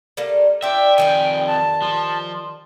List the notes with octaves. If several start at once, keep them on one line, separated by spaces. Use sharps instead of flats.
G3 A3 A#3
D4 F4 E5 G5
F2 D#3 G3 B4 G#5
A5
F3